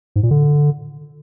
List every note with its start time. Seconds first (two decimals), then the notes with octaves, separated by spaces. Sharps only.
0.16 G#2
0.23 A#2
0.31 D3